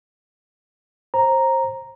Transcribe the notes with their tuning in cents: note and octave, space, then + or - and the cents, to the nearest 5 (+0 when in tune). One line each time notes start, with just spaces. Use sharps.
C5 +25 A#5 +0